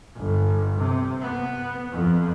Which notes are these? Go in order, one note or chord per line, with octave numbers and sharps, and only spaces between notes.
G1
C3
B3
F2